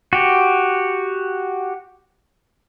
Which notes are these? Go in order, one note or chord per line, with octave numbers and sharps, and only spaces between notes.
F#4 G4